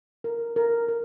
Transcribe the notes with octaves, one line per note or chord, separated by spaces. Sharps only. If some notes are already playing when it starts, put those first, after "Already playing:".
A#4
A#4
A#4